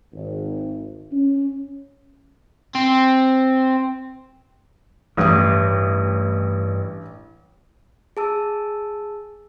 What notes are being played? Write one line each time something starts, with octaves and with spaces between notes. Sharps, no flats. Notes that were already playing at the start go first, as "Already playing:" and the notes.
G#1
C#4
C4
A1 G2 D#6
G#4 A5 E6